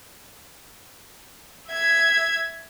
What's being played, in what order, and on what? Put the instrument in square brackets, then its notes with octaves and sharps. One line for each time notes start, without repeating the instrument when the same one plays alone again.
[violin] E5 G#6